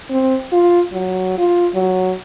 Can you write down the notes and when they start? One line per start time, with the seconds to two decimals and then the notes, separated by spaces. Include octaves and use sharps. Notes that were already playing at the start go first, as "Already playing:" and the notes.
0.10 C4
0.52 F4
0.93 F#3
1.38 F4
1.75 F#3